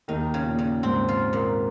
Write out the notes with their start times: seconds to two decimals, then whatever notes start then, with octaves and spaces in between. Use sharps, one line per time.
0.08 D#2 D#3 D#4
0.34 C#3
0.47 A#2
0.59 C#3
0.83 G#2 C4
1.08 F4
1.33 A#2